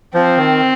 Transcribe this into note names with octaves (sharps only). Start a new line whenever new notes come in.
F3 C4
D#3